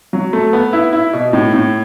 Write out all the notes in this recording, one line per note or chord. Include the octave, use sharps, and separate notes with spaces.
F#3
A3
B3
E4
E4
B2
A2
A2